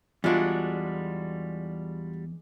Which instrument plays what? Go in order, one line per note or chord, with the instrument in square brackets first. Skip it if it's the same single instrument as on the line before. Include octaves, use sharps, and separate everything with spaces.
[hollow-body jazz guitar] E2 [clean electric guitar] G3 F#4 [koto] G#3 D4 [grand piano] F4